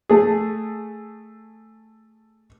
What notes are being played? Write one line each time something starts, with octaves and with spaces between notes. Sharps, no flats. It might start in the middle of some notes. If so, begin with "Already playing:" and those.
A3 G#4